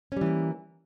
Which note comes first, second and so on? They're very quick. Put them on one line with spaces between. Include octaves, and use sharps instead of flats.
C#4 G3 E3 A#3